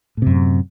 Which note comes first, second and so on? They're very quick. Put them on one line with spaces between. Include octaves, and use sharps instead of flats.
A2 C3 F#2